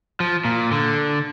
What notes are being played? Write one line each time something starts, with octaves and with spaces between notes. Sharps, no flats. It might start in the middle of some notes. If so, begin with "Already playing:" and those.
F3
A#2
D3